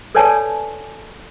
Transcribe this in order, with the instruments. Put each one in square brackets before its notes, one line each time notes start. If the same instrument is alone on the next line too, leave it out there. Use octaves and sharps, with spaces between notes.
[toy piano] A4 B4 C#5 D5 G#5 A5